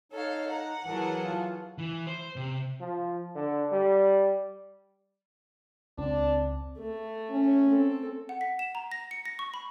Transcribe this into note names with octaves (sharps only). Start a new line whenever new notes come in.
D#4 A4 C#5 F5
F#5 A#5
E3 F#3 G#4 A#4 A5
F4
E3
C5
C3
F3
D3
G3
C#2 C4 D4
A3
C#4
C4 A4
F#5
B6
E7
A#5
A#6
C#7
A#6
C#6
B5